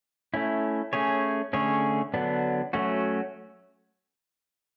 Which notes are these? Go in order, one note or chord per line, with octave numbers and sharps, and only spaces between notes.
A3 C#4 E4
A3 C#4 G#4 C#5
D3 A3 C#4 G#4 C#5
D3 F#3 B3 D4
F#3 A3 C#4 F#4